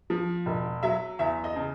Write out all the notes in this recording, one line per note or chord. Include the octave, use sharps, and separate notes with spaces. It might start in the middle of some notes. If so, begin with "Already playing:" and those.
F3
E1
F#3 E5
E2 E5
D#5
C#3